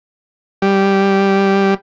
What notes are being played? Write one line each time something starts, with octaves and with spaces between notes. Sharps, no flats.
G3